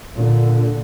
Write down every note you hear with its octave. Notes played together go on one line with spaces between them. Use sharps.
A#2 D3